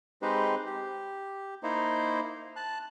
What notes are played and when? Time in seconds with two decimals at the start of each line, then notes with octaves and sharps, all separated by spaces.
0.22 G#3 C4 D#4 G4 B4 C5
0.66 G4
1.63 A#3 D#4 E4 C5
2.56 A5 F#6